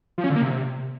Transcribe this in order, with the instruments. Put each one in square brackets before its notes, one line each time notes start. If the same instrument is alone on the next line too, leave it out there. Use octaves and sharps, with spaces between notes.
[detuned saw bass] F3
C#4
D3
A#3
C3